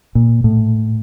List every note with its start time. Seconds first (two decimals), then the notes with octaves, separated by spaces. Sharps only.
0.15 A#2
0.44 A2